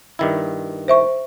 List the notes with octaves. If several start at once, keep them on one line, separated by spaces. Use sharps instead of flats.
G2 D#3 E4
C5 E5 C#6